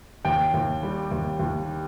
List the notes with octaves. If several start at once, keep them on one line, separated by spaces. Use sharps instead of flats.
D#2 G5
D#2
G3
D#2
D#2